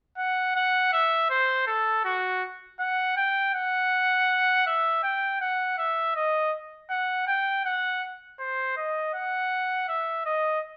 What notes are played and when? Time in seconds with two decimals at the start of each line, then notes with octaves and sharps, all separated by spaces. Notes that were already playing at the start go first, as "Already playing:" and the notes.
0.18 F#5
0.56 F#5
0.93 E5
1.30 C5
1.67 A4
2.04 F#4
2.80 F#5
3.17 G5
3.54 F#5
4.67 E5
5.03 G5
5.41 F#5
5.78 E5
6.16 D#5
6.90 F#5
7.27 G5
7.65 F#5
8.39 C5
8.77 D#5
9.14 F#5
9.89 E5
10.26 D#5